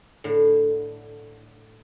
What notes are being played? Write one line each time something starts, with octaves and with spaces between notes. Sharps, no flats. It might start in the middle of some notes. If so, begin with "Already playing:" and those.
A2 D3